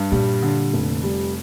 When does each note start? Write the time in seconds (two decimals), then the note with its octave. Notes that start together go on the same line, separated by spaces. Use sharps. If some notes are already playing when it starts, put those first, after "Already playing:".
Already playing: G2
0.12 A#2 G3
0.42 D3
0.74 F1
1.03 G3